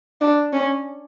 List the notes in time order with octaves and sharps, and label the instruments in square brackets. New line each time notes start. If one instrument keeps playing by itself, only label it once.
[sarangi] D4
C#4